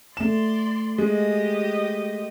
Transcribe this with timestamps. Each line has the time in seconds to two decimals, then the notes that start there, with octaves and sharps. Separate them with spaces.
0.17 A3 D5 C6 E7
0.98 G#3 G4 D#5